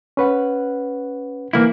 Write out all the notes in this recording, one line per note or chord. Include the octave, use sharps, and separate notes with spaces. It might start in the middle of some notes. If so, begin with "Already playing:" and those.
C#4 B4 F#5
E3 A#3 E4